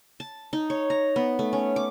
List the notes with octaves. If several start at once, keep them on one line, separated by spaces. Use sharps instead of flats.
A5
D#4
C#5
A#5
B3
A3
C#4
D6